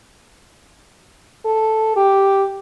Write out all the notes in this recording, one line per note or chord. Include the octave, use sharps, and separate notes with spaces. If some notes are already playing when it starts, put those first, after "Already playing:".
A4
G4